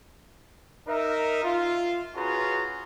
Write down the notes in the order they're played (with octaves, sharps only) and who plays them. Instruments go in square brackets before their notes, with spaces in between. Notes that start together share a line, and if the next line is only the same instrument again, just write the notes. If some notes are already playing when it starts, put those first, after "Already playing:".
[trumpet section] D#4 A#4 E5
F4
C#4 F4 F#4 G#4 B4 A#5